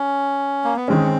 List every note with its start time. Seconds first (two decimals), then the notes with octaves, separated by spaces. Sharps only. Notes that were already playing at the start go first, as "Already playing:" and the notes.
Already playing: C#4
0.64 A#3
0.76 B3
0.88 D#3 G#3 C4 C#4